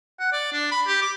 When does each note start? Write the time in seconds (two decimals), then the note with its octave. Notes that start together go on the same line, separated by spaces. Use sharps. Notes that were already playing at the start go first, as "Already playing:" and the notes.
0.20 F#5
0.32 D5
0.53 D4
0.71 B5
0.87 G4
1.02 D6